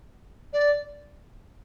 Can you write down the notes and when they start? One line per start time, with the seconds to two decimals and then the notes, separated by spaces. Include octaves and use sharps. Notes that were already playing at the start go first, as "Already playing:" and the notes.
0.53 D5